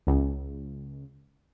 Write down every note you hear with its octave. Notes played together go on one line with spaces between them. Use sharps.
C#2